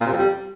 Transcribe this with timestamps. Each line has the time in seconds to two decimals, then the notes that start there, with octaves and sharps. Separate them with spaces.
0.01 A#2
0.06 C3
0.12 F2
0.18 G3